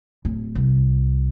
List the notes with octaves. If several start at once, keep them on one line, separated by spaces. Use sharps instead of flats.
D1
C2